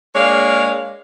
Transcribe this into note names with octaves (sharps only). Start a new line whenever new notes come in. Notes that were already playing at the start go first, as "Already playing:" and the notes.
G#3 A#3 D4 C#5 F5